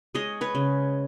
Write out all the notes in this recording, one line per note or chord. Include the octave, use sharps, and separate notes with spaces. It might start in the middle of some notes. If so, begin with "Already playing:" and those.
G#3 C#5 D#5
B4 C#5
C#3